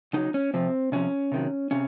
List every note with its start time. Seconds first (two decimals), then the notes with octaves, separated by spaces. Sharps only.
0.13 C#3 F#3 D#4
0.34 C#4
0.54 C3 F3 C4
0.92 C3 F3 C#4
1.32 C3 D#3 F#3
1.71 C3 C#4